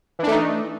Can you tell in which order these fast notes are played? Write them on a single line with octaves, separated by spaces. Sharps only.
E3 D4 A3 D#4